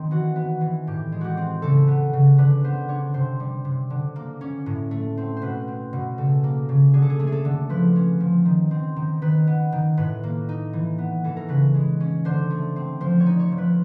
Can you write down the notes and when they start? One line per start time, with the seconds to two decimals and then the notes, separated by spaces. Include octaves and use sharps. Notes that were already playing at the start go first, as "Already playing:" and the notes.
Already playing: D#3 C4
0.11 E3 F#4
0.36 B3
0.61 E3
0.87 A2 G4
1.12 G#3
1.21 F#4 G4
1.37 C4
1.62 C#3 A4
1.88 B3
2.13 C#3
2.38 D3 B4
2.64 B3 C5
2.89 D4 C#5
3.14 C3 C5
3.40 G3
3.65 C3
3.90 D3
4.16 A#3
4.41 C#4
4.66 A2
4.91 A3
5.17 C4
5.36 C5
5.42 B2 B4
5.68 C4
5.93 B2
6.18 C#3 A4
6.44 A#3
6.69 C#3
6.93 D3 G#4
7.02 A4
7.10 G#4
7.19 A3
7.27 G#4 A4
7.45 D3
7.69 F3 B4
7.96 C#4
8.20 F3
8.45 D#3
8.71 C4
8.96 D#3
9.22 D#3 B4
9.47 B3
9.72 D#3
9.97 A2 B4
10.23 A#3
10.49 D#4
10.73 E3
10.98 B3
11.24 E3 A4
11.37 A#4
11.48 C#3 B4
11.75 G#3
12.00 C#4
12.25 D3 C5
12.50 A3
12.76 C4
13.01 F3 C5
13.20 C#5
13.26 D#4
13.40 C#5
13.52 F3
13.58 B4